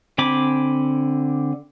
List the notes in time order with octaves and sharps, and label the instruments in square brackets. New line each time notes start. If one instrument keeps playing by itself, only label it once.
[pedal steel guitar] D3 C4 G#5 B5 D6